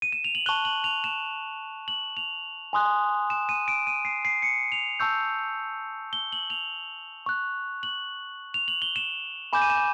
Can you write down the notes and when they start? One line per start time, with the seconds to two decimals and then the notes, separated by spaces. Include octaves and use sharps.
0.02 D#7
0.12 E7
0.24 F7
0.35 F#7
0.46 A5 C#6 F#6 G7
0.65 F#7
0.84 F7
1.04 E7
1.88 F#7
2.17 F7
2.73 G#5 C6 D#6 F#6
3.30 E7
3.49 D#7
3.68 D7
3.87 D#7
4.05 C7
4.25 C7
4.42 C#7
4.72 F7
5.00 A5 C#6 E6 G6
6.13 G7
6.32 F#7
6.50 F7
7.26 C#6 F#6
7.83 F#7
8.54 F7
8.68 F#7
8.82 G7
8.96 E7
9.53 G#5 B5 D6 G6 E7
9.62 D#7
9.70 E7